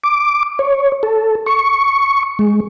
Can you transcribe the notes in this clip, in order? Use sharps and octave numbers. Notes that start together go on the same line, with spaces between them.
D6
C#5
A4
C#6
G#3